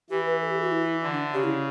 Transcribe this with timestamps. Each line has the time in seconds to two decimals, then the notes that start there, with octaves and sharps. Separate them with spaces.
0.10 E3 G4
0.26 B4
0.42 A4
0.51 G4
0.61 F#4
0.72 E4
1.03 D3
1.13 D4
1.33 C#3 G4
1.44 E4